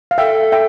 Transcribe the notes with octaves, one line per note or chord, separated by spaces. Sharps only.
F5
A4 E5 G5
E5 G5